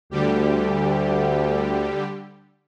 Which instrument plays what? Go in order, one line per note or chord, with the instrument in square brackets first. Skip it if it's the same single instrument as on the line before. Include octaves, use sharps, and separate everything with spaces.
[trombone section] D2 [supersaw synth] D3 G3 G4